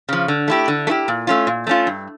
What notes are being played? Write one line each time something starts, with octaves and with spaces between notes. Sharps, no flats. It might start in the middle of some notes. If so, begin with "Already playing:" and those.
C#3 F3
D3
A3 E4 G4
D3
A3
E4 G4
A#2
A3 C#4 F4
A#2
A3 C#4 F4
G2